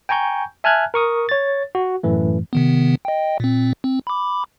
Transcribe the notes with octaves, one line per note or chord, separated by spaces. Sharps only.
G5 G#5 A#5 C#6 G6
E5 G#5 A5 F6 F#6 G#6
A#4 C#6 D#6
C#5 A6
F#4
F#2 A2 E3 A3
C3 D#3 B3
D#5 G5
A#2 C4
C4
B5 D6